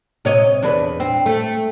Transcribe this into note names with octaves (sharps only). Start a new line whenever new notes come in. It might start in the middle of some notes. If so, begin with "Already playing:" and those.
C3 C#5 D#5
E2 D4 B4
C4
A3